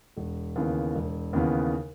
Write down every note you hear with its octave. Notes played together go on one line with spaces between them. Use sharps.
E1
D#2 C#3 E3 B3
E1
D#2 C#3 E3 B3